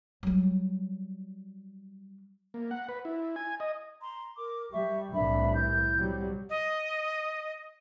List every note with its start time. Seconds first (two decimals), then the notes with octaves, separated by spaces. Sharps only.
0.23 F#3 G3
2.54 A#3
2.71 F#5
2.89 B4
3.05 E4
3.36 G#5
3.60 D#5
4.01 A#5 C6
4.37 A#4 D6
4.72 G3 E5 C#6
5.12 C2 A2 E3 D4 E5 B5
5.54 E4 G6
5.95 C3 F#3 G3
6.50 D#5